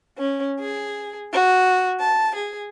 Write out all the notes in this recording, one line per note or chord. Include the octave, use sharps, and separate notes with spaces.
C#4
G#4
F#4
A5
G#4